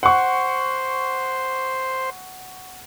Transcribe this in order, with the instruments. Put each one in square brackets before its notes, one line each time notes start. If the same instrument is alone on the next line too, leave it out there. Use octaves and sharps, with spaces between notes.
[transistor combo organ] C5 [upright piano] F#5 C#6